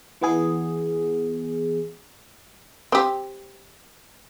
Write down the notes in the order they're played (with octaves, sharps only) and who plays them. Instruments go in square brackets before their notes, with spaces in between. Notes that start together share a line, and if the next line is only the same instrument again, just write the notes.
[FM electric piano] E3 B3 G#4
[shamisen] C4 G4